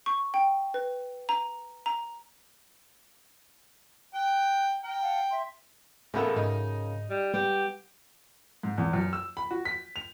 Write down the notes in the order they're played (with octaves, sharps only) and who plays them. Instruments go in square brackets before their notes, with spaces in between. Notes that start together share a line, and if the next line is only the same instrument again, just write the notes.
[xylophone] C#6
G5
B4
A#5
A#5
[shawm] G5 [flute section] F#6
[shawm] G5 [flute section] A#5 F6
[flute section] F5 F#5 A5
E5 C6
[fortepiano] A1 B3 A4 [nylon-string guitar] C#3 F#4 A#4
[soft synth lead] G#2 [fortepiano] D#4
[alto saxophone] G3
[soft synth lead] G3 [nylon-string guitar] B3 [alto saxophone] G4
[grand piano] G#2
E2
F#2
E6
B5
F#4
B6
F7